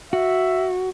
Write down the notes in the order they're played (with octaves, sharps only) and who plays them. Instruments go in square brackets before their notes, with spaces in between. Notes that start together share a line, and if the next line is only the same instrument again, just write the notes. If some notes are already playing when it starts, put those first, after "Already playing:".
[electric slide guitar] F#4 [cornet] E5